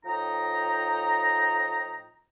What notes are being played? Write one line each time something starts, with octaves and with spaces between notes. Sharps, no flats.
A2 F3 D#4 G5 A#5